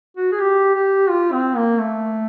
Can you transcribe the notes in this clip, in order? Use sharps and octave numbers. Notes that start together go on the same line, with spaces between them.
F#4
G#4
G4
G4
F4
C4
A#3
A3